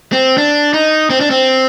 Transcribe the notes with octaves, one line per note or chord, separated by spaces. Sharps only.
C4
D4
D#4
C4
D4
C4